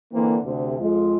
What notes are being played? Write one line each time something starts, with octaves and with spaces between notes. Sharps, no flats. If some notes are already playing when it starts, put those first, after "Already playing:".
D3 E3 A#3 C4
D2 C3
F2 G#3 F4